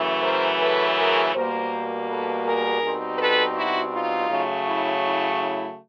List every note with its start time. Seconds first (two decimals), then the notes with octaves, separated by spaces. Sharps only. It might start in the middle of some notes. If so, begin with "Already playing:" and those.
Already playing: F#2 C#3 E3 A3
0.22 A#4 C5
0.60 A4 B4
0.97 G#4 A#4
1.33 B2 G3 A#3 A#4 C5
2.08 A4 B4
2.44 G#4 A#4
2.81 B2 G3 C4 D#4
3.18 A4 B4
3.55 E4 F#4
3.92 D#4 F4
4.29 C#3 F#3 A3
4.67 E4
5.03 E4
5.40 E4